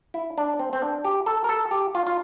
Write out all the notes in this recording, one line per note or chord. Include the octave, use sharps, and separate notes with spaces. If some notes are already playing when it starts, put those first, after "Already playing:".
E4
D4
C4
C4
D4
G4
A4
A#4
A4
G4
F4
F4